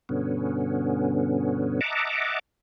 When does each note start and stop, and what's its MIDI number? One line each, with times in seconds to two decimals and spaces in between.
0.09 1.81 43
0.09 1.81 47
0.09 1.81 50
0.09 1.81 59
0.09 1.81 61
1.81 2.39 75
1.81 2.39 76
1.81 2.39 78
1.81 2.39 81
1.81 2.39 82
1.81 2.39 86